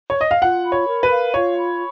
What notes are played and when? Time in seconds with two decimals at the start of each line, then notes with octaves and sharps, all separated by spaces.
0.10 C#5
0.21 D#5
0.31 F5
0.41 F4 F#5
0.65 B5
0.72 C#5
0.87 A#4
1.03 B4
1.11 F5
1.34 F4 C#5
1.57 B5